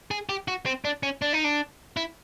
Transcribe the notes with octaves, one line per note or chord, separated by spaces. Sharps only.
G#4
G4
F#4
C4
D4
C#4
D4
D#4
D4
E4